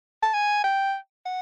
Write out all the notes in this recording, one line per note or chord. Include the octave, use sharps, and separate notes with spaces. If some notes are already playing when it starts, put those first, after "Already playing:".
A5
G#5
G5
F#5